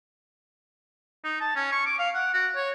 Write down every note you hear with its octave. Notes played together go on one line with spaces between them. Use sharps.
D#4
A5
C#4
C#6
D6
F5
F#5
F#4
C#5